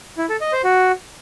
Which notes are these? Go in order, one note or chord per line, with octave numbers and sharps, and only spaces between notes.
E4
A4
D#5
C5
F#4